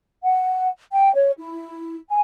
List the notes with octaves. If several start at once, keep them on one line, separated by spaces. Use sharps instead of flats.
F#5
G5
C#5
E4
G#5